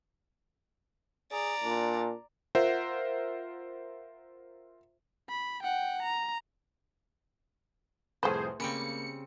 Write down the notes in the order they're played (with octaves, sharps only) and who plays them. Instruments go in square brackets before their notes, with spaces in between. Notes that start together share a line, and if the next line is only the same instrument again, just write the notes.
[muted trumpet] G#4 [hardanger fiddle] D5 A#5
[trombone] A#2 [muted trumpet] D4
[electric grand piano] F4 A#4 C5 E5 F#5
[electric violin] B5
F#5 G5
A#5
[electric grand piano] C2 F2 A2 [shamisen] A3 B4 [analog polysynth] G#4 C5
[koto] C#3 G3 C4 [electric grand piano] A#3 B5 D7 [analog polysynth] C#7